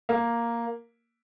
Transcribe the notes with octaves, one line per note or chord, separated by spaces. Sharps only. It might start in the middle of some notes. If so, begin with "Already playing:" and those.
A#3